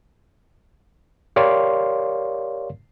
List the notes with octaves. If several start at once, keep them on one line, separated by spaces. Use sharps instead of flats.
G4 A#4 C#5 D5 F5 C6